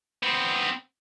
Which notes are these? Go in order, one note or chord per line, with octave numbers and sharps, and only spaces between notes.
B3 C4